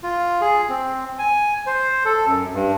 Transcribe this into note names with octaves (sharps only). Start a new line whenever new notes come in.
F4
G#4
C4
G#5
C5
A4
F#2
G2